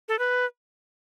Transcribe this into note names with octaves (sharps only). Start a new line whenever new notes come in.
A4
B4